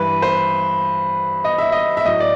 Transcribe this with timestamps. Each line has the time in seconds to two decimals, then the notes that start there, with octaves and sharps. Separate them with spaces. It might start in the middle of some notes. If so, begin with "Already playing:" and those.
Already playing: G2 E3 B4
0.22 C5
1.44 D#5
1.58 E5
1.72 D#5
1.97 E5
2.05 A2 F#3 D#5
2.20 D5